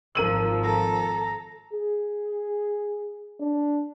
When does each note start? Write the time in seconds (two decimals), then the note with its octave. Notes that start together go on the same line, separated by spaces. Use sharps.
0.15 G#1 F3 A#4 E6 D#7 F#7
0.64 A4 A#5
1.73 G#4
3.40 D4